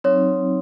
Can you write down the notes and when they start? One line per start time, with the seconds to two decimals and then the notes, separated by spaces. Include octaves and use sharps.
0.04 F#3 C4 D#4 C#5